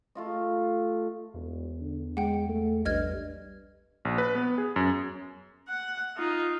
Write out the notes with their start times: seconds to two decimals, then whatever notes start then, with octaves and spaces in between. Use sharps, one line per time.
0.15 A3 F4 D#5
1.34 E1 E2
1.81 D3
2.17 G#3 F#5 G5
2.49 A3
2.85 A#1 G2 D#5 F6 G#6
4.05 A#1
4.18 B4
4.35 B3
4.58 G#4
4.76 F#2
5.69 F#5
6.17 D#4 F4